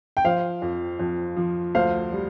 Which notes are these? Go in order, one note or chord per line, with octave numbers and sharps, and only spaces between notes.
G5
F3 C5 F5
F2
F2
F3
D2 C5 F5
G3